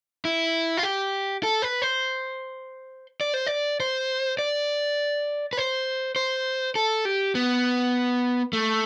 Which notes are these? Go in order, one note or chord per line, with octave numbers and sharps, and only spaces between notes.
E4
F4
G4
A4
B4
C5
D5
C5
D5
C5
D5
B4
C5
C5
A4
G4
B3
A3